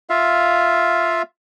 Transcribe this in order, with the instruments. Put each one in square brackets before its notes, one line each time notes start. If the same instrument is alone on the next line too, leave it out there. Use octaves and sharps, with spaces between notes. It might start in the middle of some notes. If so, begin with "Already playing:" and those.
[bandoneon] F4 E5 F5